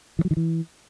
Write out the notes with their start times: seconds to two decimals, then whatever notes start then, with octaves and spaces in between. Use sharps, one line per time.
0.19 E3
0.25 F#3
0.31 D#3
0.37 E3